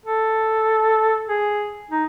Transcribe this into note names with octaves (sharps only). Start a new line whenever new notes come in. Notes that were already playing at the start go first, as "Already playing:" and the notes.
A4
G#4
D#4